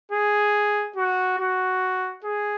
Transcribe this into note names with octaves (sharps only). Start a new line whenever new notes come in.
G#4
F#4
F#4
G#4